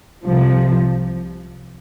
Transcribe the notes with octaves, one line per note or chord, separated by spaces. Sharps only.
C2 C3 F3